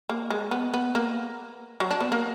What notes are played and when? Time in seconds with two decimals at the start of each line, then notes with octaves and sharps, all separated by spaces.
0.09 A#3
0.30 G#3
0.51 B3
0.74 B3
0.95 A#3
1.80 F#3
1.91 D4
2.01 B3
2.12 A#3